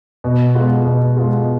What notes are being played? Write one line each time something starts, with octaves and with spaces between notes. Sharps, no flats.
B2
G#3 B3 F4
B2
G#3 B3 F4